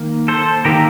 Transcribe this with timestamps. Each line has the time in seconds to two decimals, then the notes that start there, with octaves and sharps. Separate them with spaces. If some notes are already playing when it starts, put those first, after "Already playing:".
Already playing: D#3 A#3
0.28 A4 C5
0.65 D#3 A#3 G4 A#4